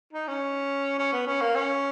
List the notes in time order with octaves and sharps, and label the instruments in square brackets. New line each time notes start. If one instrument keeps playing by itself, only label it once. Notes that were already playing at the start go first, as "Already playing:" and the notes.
[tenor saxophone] D#4
C#4
C#4
B3
C#4
A#3
C#4